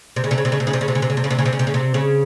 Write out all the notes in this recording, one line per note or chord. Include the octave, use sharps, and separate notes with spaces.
C3
C#3
C3
C#3
C3
C#3
C3
C#3
C3
C#3
C3
C#3
C3
C#3
C3
C#3
C3
C#3
C3
C#3
C3
C#3
C3
C#3